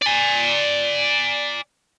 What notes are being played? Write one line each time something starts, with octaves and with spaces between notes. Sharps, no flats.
D5 G#5